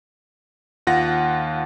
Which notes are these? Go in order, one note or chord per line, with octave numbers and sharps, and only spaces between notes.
D#2 F4 F#5 A#6